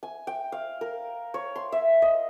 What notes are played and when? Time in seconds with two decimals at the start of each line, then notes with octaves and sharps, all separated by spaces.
0.03 G#5
0.27 G5
0.52 F5
0.81 A#4
1.34 C#5
1.56 C6
1.72 E5
2.02 D#5